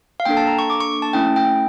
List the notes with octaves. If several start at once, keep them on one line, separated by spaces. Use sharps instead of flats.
F5
A#3 D4 A4 G5
A5
A#5
C#6
D6
C#6
A5
A3 C#4 E4 G5
G5